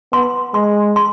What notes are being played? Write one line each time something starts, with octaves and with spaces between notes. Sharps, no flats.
B3 C6
G#3 C6
C6